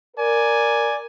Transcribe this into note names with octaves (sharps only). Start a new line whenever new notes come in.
A#4 D5 G#5